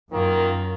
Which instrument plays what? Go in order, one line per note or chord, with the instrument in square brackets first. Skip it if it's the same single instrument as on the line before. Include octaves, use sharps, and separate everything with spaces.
[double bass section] F#2 [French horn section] D#3 A#3 F4 A#4